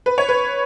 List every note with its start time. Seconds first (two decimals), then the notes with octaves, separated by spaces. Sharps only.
0.06 B4
0.18 C#5
0.29 B4